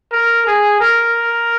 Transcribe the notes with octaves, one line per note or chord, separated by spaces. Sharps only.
A#4
G#4
A#4